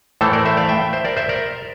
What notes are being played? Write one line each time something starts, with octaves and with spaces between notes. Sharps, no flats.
A2 E3 A3 A4 C5
A#4 D5
C5 E5
D5 F5
E5 G5
C5 E5
A#4 D5
C5 E5
A#4 D5